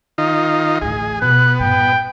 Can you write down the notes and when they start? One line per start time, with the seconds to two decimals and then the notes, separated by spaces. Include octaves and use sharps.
0.18 D#3 D#4 F4
0.82 A1 D2 G#4
1.22 B2 B3 F4 F#6
1.60 G2 A#2 G5